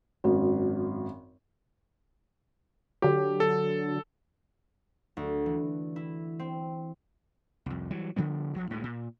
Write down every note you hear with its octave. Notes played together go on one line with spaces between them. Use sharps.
G#1 F#2
D3 F#3 G4
A4
D2
E3
E4
C4
C2 F2
E3 F#3 G3
C#3 F3 G3 B3
B1 F3 F#3
D2 A2 G#3
A#2